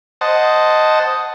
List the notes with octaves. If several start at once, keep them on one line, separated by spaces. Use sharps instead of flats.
C5 D#5 F#5 A5